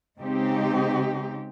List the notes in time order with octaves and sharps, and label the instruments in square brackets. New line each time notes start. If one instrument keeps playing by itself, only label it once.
[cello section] C#3 G#3 C4 D#4 G4